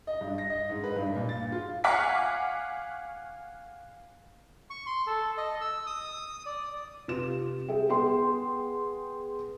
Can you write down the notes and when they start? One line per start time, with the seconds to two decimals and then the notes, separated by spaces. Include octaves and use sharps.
0.07 D#5
0.21 G2
0.38 A#6
0.50 D#5
0.70 G#2
0.84 B4
0.96 G2
1.15 A#2
1.29 A6
1.52 F4
1.84 F5 F#5 G#5 C#6 D6 B6
4.70 C#6
4.87 C6
5.07 A4
5.38 D#5
5.61 E6
5.87 D#6
6.46 D5
7.08 C3 F4 B4 E7
7.68 G#4 E5 G5
7.89 B3 G#4 G5 C6